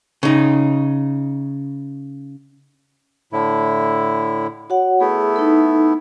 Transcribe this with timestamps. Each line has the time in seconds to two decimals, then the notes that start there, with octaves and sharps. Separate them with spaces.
0.23 C#3 D#4
3.33 A2 D3 E4
4.70 F#4 C#5 F#5
5.00 A3 B3 E4 G#4
5.36 D#4 A4